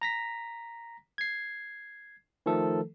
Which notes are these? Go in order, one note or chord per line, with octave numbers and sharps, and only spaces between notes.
A#5 A#6 B6
G#6 C7
D#3 F3 A3 A4